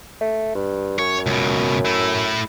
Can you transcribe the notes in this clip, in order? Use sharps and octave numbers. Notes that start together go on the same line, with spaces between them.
A3
G2
F#2 C#5
C#2 B2
A3 E4